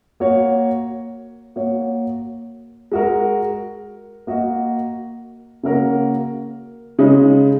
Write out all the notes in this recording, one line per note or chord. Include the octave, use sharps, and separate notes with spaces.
A#3 F#4 C#5
A#3 F#4 C#5
G#3 F#4 A#4
A#3 F#4 D#5
C#3 A#3 F#4 A#4
C#3 G#3 D#4